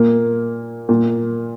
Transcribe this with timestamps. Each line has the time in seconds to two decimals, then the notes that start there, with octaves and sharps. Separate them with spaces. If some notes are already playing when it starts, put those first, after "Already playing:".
Already playing: A#2 A#3
0.89 A#2 A#3